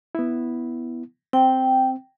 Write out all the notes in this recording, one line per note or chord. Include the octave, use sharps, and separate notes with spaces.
B3 E4
C4 G5